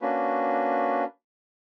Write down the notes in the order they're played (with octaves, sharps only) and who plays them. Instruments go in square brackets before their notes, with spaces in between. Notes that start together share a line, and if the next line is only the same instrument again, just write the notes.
[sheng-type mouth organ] A#3 C#4 D4 F#4 B4